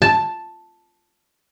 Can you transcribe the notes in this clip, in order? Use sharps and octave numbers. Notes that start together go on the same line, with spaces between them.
A5